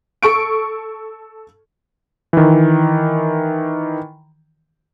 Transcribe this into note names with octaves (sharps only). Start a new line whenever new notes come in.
A4 C#6 D7
D#3 E3